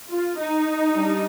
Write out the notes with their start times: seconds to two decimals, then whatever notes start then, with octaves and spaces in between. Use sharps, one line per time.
0.10 F4
0.37 D#4
0.95 G3 D4